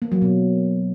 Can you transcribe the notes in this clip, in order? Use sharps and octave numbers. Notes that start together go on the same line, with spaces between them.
A#3
F#3
B2